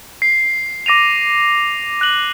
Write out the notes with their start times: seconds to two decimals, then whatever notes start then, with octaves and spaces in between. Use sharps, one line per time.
0.22 C7
0.86 D6 A#6 D#7 F7
2.01 F#6 F#7